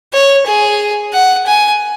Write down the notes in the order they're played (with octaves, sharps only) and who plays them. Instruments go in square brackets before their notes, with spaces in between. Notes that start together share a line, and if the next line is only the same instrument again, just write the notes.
[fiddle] C#5
G#4
F#5
G#5